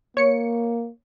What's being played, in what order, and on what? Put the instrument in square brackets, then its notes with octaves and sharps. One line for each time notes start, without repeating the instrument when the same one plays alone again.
[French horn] A#3 [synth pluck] C#5 C#7